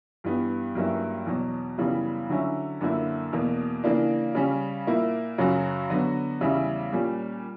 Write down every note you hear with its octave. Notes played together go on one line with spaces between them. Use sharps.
G2 E3 B3
G2 F#3 A#3 C#4 E4
E2 B2 F#3
F#2 C#3 E3 G3 B3
D3 F#3 C#4 E4
F#2 D3 A#3 E4
E2 B2 A#3
C#3 E3 A#3 D4
C#3 G3 C#4
A#2 A#3 E4
F#2 C#3 F#3 C#4 F#4
D3 F#3 B3 F#4
E2 C#3 G3 C#4 E4
A#2 G3 C#4